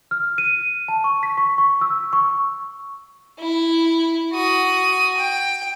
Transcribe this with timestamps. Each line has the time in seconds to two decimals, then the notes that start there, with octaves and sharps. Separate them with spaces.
0.11 F6
0.38 D#7
0.88 A5
1.04 C#6
1.23 B6
1.38 C#6
1.58 C#6
1.81 E6
2.13 C#6
3.40 E4
4.33 F#4 D#6
5.18 G5